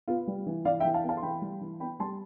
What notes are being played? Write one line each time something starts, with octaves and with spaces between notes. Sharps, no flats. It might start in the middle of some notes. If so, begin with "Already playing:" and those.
B3 F4
G3
E3
E3 D5 F5
E5 G5
E3
F5 A5
B3
F5 A5
C6
E3 G5 B5
G3
E3
B3 G5 B5
G3 A5 C6